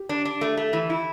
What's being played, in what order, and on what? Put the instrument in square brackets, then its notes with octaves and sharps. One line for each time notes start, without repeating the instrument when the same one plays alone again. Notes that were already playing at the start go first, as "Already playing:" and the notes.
Already playing: [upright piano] G4
[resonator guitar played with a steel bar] D4
D4
A3
A3
E3
E4